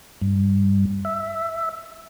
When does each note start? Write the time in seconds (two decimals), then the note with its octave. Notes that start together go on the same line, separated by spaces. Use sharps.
0.22 G2
1.05 E5